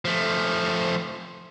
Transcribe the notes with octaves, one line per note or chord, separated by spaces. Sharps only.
F3 A3